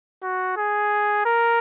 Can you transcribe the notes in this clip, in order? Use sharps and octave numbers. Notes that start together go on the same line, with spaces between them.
F#4
G#4
A#4